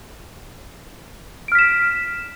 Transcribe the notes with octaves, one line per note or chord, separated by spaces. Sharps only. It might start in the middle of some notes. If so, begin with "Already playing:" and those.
F6 B6 D7 E7